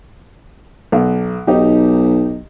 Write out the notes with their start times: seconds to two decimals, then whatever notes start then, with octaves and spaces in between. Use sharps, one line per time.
0.92 B1
1.47 B1 D#4 G4